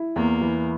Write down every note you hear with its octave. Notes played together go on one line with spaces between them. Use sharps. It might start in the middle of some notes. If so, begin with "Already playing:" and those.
Already playing: E4
E2 A#3
E3